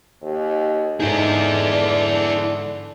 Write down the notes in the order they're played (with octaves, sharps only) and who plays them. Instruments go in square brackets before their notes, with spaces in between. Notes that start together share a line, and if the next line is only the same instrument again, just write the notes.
[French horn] D#2
[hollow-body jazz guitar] G#2 D#4 [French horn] D3 [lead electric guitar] E4 G#4